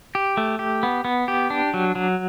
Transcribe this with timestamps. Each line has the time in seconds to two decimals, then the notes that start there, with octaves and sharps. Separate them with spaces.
0.15 G4
0.37 A3
0.59 G4
0.83 B3
1.05 B3
1.28 G4
1.50 D4
1.74 F#3
1.95 F#3